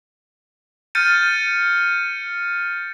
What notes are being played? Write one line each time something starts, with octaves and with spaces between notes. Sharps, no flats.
F6 G6 A6 C#7 D#7